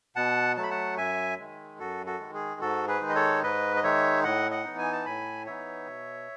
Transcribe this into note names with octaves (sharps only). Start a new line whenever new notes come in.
B2 F#5 A5
F#3 A3 A5
B5
F#5 A5
F#2 E5 G#5
D#3 G#3
F#2 F#4 A4
F#4 A4
D#3 G#3
G#4
G#2 F#4 A4
G#4 B4
D#3 G#3 D#4
D#5
A4 C#5
G#2 B4 D#5
D#5
D#3 G#3 D#4 C#5 E5
A2 D#5 F#5
D#5 F#5
E3 B3 D#4
G#5
A5
A2 G#5 B5
E3 B3 D#4 C#5 E5
B2